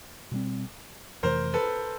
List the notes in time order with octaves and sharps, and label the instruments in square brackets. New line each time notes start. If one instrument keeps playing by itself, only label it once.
[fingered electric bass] B2 G3 C4
[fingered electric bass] F2 C3 E3 A3 [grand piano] A#4 C5
[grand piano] A4 B4